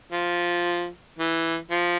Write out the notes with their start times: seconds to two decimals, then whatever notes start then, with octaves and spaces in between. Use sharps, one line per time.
0.12 F3
1.19 E3
1.71 F3